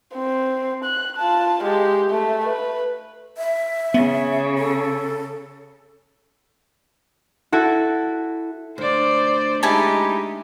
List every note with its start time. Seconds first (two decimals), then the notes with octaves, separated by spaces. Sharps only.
0.14 C4
0.85 F#6
1.17 F4 A5
1.64 G#3 G4
2.10 A3
2.44 B4
3.37 E5
3.94 C#3 B3
4.58 A4
7.52 E4 F#4 A4
8.78 D2 C5 D5
9.63 G#3 D#4 E4 G4 G#5 A5